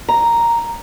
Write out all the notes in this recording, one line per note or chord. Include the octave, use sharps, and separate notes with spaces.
A#5